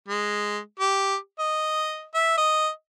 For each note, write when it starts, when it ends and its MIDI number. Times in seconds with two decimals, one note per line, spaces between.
0.09 0.58 56
0.80 1.16 67
1.39 2.04 75
2.15 2.33 76
2.38 2.69 75